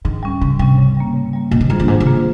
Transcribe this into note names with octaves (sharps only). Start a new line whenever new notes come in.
G#2 D#3
G3 C#4
G#2 C#3
C3 G3 C#4
C#3
G3 A#3
C#3
G3 A#3
A#2 D#3
C3
G#2 A#3 F4 G#4 C5
G2
G#2 D#3
C3
A#3 F4 G#4 C5